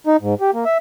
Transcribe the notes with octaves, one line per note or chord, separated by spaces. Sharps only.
D#4
G#2
G4
A#3
E5